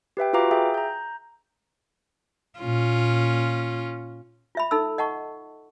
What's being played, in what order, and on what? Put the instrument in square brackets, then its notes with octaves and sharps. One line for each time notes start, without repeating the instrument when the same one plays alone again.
[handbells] G4 B4 E5 G5
F4 F#4 B4 F5 A#5 D6
G#4 E5 G5
A#5 G6
[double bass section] A#2 [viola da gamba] C#4 F4
[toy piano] F4 E5 B5
D#4 A4 B5 E6
D#5 F#5 A5 C#6